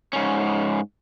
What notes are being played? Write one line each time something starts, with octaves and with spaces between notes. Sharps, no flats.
G#2 C#4